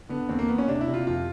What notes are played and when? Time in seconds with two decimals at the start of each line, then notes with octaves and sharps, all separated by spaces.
0.09 D3 B3
0.29 D#2 C4
0.39 A#3
0.49 D#2 B3
0.58 C#4
0.68 C3 D4
0.81 E4
0.87 C3
0.94 F4
1.07 F2 F4